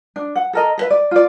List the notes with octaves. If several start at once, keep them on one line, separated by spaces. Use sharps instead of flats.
D4
F#5
A4 A#4 D#5
A4 B4 E5
D5
F4 D5